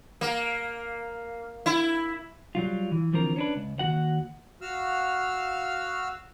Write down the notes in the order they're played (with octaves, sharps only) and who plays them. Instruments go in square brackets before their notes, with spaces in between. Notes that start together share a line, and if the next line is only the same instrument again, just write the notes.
[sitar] A#3
E4
[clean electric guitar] F#3 G3 F4
E3
D3 E3 F3 C4 A#4
C#4 D4 B4
C#2
D#2 C3 F#4 F#5
[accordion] F#4 F5 E6 F6